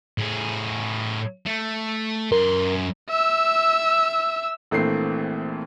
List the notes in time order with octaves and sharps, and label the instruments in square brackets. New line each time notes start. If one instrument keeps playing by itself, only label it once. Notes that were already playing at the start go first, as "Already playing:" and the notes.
[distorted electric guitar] A2 G#4
A3
[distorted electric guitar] F#2 C6 [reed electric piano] A#4
[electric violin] E5 E6
[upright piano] A#1 E3 A3 A#3 C4 C7